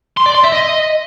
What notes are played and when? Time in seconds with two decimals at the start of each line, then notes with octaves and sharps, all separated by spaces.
0.17 C6
0.26 D5
0.35 C6
0.43 E5
0.52 D#5